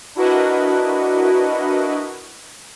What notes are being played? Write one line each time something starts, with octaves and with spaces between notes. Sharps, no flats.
D4 E4 F#4 A#4 B4 D#5